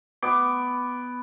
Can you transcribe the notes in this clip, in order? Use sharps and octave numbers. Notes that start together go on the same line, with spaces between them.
B3 D6